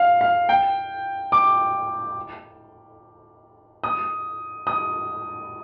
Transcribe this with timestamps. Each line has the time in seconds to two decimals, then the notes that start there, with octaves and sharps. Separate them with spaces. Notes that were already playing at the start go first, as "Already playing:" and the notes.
Already playing: F5
0.21 F5
0.49 G5
1.32 D6
3.84 D#6
4.67 D#6